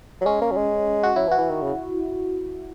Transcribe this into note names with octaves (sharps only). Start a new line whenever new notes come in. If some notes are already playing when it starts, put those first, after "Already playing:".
F#3
G#3 C#4
A#3
F#3
G#3
F#4
F#3 E4
E3
F#4
E3
D#3
C#3